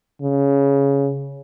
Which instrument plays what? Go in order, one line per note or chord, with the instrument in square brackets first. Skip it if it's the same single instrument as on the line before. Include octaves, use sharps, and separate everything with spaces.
[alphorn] C#3